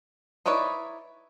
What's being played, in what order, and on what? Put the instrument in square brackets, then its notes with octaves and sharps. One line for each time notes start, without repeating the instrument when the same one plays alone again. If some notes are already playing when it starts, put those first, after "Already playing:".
[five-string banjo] D#4 E4 B4 C#5 D5